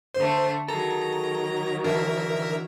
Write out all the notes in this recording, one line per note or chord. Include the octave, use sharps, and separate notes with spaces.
D3 A3 C5
D#3 F#3 G#4 A4 A#5
D3 E3 D4 A#4 E5